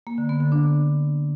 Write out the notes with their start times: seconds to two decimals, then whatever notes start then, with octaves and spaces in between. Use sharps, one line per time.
0.07 A#3
0.18 D3
0.29 B3
0.41 D3
0.52 D4